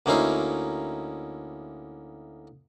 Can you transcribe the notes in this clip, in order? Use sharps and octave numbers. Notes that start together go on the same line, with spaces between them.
D2 A#3 C#4 D#4 E4 C5